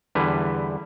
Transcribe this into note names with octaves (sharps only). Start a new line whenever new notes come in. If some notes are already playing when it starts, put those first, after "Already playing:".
E2 D3 G3 E4 B4